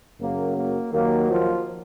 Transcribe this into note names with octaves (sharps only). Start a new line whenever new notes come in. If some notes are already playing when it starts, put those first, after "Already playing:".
F#2 C#3 F#3 A#3
A#3
D#2 D#3 F#3 A#3
F3 F4